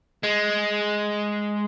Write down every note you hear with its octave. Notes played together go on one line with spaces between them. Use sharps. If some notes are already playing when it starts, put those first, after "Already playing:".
G#3